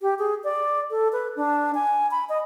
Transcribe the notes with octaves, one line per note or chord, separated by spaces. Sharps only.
G4
G#4
D5
A4
B4
D4
G#5
B5
D#5